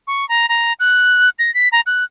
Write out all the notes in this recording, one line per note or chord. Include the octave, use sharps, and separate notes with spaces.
C#6
A#5
A#5
F#6
A#6
B6
A#5
F#6